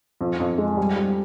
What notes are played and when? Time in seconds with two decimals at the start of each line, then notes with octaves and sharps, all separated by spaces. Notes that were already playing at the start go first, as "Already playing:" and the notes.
0.21 F2
0.40 F2
0.58 G#3
0.77 G3
0.96 G3